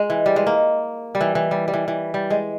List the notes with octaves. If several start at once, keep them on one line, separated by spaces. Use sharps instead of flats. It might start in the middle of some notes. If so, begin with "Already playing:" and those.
Already playing: G#3
E3
G3
G#3
A#3
G3
E3
E3
G3
G3
E3
E3
G3
G#3